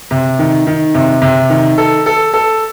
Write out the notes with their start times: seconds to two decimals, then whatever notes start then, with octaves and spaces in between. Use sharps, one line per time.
0.11 C3
0.39 D#3
0.67 D#3
0.94 C3
1.22 C3
1.50 D#3
1.78 A4
2.06 A4
2.34 A4